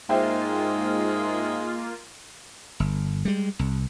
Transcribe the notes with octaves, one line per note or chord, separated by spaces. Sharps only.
G#2 G#3 A#3 F4 C5 E5 G5
G1
G3 G#3
C2